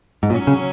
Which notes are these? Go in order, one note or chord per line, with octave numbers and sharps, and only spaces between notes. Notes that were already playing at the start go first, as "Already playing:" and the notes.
G#2
A#2 F#3 C#4
C#3